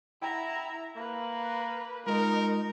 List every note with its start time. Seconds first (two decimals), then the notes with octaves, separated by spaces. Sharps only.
0.22 E4 E5 F#5 G5 A#5
0.97 A#3 B4
2.07 G#3 D#4 F4 A#4